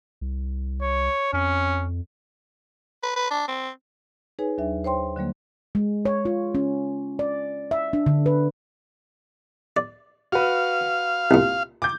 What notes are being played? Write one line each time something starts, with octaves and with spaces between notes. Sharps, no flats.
C2
C#5
F2 C#4
B4
B4
D4
C4
D#4 G#4 B4 C#5 G#5
D#2 F#3 D4 E5
C5 C#5 G5 C6
D3 F#3 G3 A#3
G#3
C#5
F4
C#4
D5
E5
D4
D3
B4
D5
F#4 B4 F5
C2 A#2
D6 G6